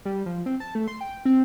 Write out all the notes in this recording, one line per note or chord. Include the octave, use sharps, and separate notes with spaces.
G3
F3
C4
A5
A3
C6
G5
C4